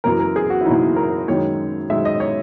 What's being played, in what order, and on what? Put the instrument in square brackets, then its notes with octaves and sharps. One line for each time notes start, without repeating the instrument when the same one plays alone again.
[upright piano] F#1 F#2 E3 A#4
A#4
G#4
F#4
E4
F#1 F#2 E3 D#4
A#4
F#2 D#3 G#3 C#5
F#2 D#3 G#3 E5
D#5
C#5